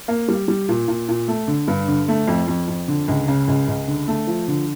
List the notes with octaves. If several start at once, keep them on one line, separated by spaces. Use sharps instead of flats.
A#3
G3
G3
A#2
A#2
A#2
A3
D3
G2
D3
A3
F2
F2
F2
D3
C#2
C#3
C#2
C#2
D3
A3
F3
D3